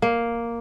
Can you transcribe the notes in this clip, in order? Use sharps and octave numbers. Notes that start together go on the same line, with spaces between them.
A#3